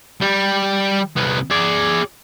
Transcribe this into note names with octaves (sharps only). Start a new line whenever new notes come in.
G3
C2 B3
G#4 D5